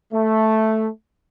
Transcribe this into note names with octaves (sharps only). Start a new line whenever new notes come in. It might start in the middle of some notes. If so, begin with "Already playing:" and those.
A3